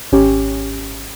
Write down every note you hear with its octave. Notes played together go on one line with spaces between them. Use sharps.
G#1 C#4 G4